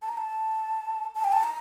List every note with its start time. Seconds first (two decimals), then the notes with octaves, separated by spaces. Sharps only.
0.02 A5
0.09 A#5
0.17 A5
1.15 A5
1.24 G5
1.32 A5
1.43 A#5